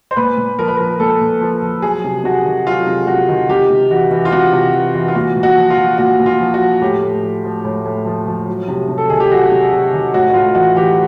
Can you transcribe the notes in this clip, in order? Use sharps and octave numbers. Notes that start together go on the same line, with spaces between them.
C5
A#2 B4
A#2
F3 A#4
B4
A#4
F3
A#2 A4
A#2
F3
F3
F#3 G#4
C3
C3 F#4
D#3
F#3 F4
C3
C3 F#4
D#3
C3 G4
C3
E3 F#4
E3
F4
C3 F#4
C3
E3
E3
F4
A#2 F#4
A#2
F#4
F3
F4
F3
A#2 F#4
A#2
F4
F3
F#4
F3
A2 G4
A2
F3
F3
A2
A2
F3
F3
F#3
C3
C3
A4
D#3 G#4
G4
F#3 F#4
C3
C3
D#3
A2 F#4
F#4
A2 F4
E3 F#4
E3 G4